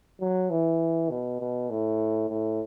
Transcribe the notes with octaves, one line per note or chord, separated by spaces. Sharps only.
F#3
E3
B2
B2
A2
A2